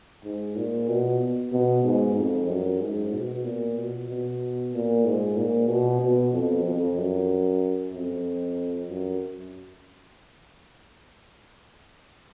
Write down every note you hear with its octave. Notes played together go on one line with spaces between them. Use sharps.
G#2
A#2
B2
B2
G#2
F2
F#2
G#2
B2
A#2
B2
B2
A#2
G#2
A#2
B2
B2
F2
F2
F#2
F2
F#2